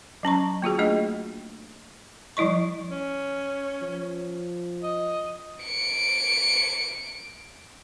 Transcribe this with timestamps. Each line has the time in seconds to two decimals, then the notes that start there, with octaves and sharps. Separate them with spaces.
0.23 F#3 C#4 A#5 C#6
0.62 A#3 F4 F#4 G#4
0.79 A3 A#3 D4 G#4 D#5
2.37 F3 G3 E4 D#5 C#6
2.89 C#4
3.82 F3
4.83 D#5
5.64 C#7 D7